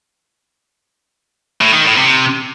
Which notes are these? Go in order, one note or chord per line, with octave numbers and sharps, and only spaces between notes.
A2
D#3
A2
C3